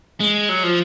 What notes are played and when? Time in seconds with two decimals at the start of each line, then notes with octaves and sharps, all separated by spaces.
0.20 G#3
0.49 F#3
0.63 F3